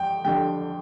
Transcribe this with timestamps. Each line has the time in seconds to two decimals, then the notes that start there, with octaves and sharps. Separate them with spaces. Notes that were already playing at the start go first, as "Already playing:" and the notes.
Already playing: F2 G5
0.25 F2 D3 G3 G5